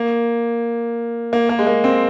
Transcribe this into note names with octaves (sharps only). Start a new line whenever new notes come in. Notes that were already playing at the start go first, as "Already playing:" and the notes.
Already playing: A#3
A#3
A#3
G#3
A#3
C4